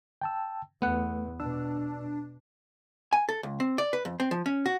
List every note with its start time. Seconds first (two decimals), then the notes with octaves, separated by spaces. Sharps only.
0.22 G5 A5 E6
0.82 E2 A3 B3 F#5
1.40 B2 D4 E6
3.13 G#5
3.29 A4
3.43 C#2
3.60 C4
3.78 D5
3.93 B4
4.05 F2
4.20 C4
4.31 F3
4.46 C#4
4.66 F#4